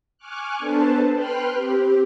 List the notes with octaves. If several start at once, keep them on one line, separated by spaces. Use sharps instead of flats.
G#5 C#6 D6 F6 F#6
B3 D4 A4 B4 C5 A5
B4 G5 B5 C6 F6 F#6
C4 G4